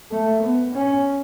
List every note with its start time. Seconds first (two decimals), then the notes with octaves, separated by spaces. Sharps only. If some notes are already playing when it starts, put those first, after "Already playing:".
0.11 A3
0.42 B3
0.75 C#4